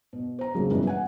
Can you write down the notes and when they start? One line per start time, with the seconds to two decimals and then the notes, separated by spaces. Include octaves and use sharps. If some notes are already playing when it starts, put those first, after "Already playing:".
0.13 B2
0.39 C5 A#5
0.55 C#3 F3 F#3 G#3 A#3
0.71 F#2 B2 E3 F#3 G3
0.87 F#5 G#5